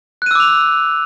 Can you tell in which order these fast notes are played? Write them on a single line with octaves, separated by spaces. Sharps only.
F#6 D#7 E6 D6 F7